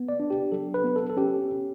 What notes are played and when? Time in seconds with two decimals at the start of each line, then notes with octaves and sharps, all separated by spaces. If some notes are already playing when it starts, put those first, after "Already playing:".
Already playing: B3
0.09 D5
0.20 D4
0.30 G4
0.52 F#3 A4
0.74 B4
0.84 B3
0.96 A4
1.10 A4
1.17 C#4 G4